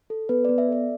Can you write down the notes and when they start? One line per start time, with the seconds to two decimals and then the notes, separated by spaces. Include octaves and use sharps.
0.10 A4
0.29 B3 B4
0.45 B3 D5
0.58 E5
0.68 A4 D5